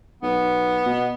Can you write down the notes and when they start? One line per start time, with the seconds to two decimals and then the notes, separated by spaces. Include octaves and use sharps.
0.22 B1 B3
0.86 B2